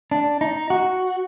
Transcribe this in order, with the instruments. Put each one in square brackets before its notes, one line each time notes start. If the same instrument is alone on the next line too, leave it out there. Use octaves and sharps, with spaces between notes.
[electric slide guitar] D4
D#4
F#4